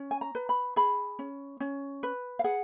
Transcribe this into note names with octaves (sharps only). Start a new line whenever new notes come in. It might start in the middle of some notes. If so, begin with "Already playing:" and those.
Already playing: C#4
G#5
A#5
B4
B5
G#4 B5
C#4
C#4
B4
F5
G#4 F#5